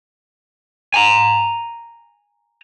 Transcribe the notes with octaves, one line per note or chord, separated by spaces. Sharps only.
G#5 A#5